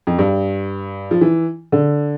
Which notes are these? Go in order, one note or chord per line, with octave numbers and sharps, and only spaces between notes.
F2
G2
F3
E3
D3